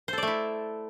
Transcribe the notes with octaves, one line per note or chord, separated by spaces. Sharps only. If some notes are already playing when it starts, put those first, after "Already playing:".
A3 E4 A4 C5 D5